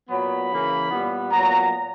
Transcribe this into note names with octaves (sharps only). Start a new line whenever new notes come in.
A#2 F#3 B3 B5
C#3 E3 A#3
A#2 G3 B3
A#2 F#3 B3 A#5